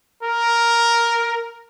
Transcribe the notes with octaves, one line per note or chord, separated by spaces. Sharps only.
A#4